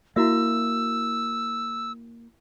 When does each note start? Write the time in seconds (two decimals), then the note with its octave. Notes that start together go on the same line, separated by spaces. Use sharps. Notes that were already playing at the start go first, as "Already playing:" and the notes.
0.16 A#3 E4 F#4 E5 E6